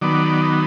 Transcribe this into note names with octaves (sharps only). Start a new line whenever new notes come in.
D#3 F#3 B3 D5